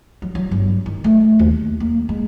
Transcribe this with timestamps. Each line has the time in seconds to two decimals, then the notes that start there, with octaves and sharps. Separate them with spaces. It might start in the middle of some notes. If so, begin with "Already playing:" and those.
0.22 F#3
0.35 F#3
0.51 G1
0.86 D#3
1.04 A3
1.39 D#2
1.80 A#3
2.09 G#3